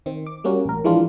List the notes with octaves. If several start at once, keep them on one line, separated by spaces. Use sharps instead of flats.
D#3 C4
D6
G3 A#3 C#4 F#4
A1 A#4
E3 F3 G#3 A#3 D4 F4